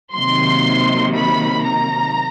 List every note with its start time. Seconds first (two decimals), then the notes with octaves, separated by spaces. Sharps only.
0.14 C3 D#3 F#3 A#3 C6
1.15 B5
1.65 A#5